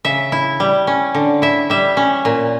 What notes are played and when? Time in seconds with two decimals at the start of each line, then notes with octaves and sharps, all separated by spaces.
0.05 C#3 E5
0.32 E4
0.60 G3
0.87 C#4
1.14 D3
1.42 E4 E5
1.70 G3 E5
1.97 C#4
2.25 A#2